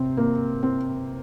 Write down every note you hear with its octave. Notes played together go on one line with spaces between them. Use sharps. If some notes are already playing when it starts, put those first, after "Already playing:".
Already playing: C3 C4
A#3
C4